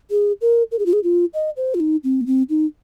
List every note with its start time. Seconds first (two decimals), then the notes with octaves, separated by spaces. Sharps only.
0.11 G#4
0.41 A#4
0.72 A#4
0.79 G#4
0.86 F4
0.93 G#4
1.04 F4
1.34 D#5
1.57 C5
1.74 F4
1.80 D#4
2.04 C4
2.21 A#3
2.27 C4
2.50 D#4